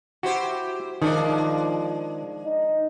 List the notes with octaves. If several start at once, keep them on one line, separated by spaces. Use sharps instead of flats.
E4 F#4 G4 C5
D#3 F3 G#3 D4 D#4
D#4